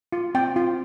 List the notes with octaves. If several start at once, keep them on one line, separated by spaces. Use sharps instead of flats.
F4
C4 G5
F4